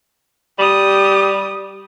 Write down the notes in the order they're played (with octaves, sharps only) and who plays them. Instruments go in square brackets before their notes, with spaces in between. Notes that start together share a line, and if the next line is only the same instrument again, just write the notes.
[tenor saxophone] G3 [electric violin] G4 D#6